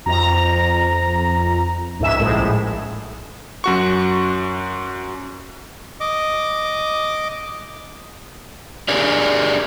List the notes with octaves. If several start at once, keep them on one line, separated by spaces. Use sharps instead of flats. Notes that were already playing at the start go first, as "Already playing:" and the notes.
F2 A#5
C#2 G#2 E5 E7
A#1 A2 G#3
F#2 F#4 C#6
D#5 D6
D4 G4 G#4 A#4 D5